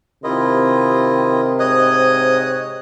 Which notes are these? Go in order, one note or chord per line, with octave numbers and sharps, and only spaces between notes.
C3 D#3 E4 F4 D#5
G#2 C#5 D#5 D#6 F#6